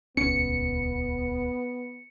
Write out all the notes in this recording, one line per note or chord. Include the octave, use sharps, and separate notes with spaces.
D#1 C#2 B3 C#4 C#7